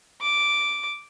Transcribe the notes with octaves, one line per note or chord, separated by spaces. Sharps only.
D6